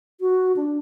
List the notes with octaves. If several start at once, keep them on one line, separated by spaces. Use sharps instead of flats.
F#4
D4